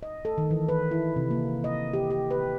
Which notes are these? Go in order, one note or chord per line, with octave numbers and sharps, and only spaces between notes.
D#5
A4
D#3
E3
B4
E4
C3
A#3
D#5
G4
G4
B4